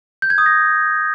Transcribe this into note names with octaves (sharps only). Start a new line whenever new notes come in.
G6
G#6
D#6
A#6